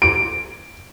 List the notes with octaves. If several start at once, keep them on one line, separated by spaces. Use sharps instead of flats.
D7